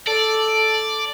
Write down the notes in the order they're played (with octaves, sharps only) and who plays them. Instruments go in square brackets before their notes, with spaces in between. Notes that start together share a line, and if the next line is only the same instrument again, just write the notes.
[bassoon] A4 [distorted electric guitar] D5